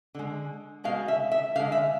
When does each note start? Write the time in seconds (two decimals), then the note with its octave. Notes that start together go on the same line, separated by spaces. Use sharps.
0.15 D3 G#3
0.84 B2 G#3 F5
1.08 E5
1.32 E5
1.56 D3 F5
1.59 G#3
1.72 E5